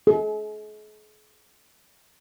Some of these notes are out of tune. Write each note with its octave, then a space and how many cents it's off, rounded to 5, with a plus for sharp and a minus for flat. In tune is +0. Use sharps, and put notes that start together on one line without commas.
G#4 +45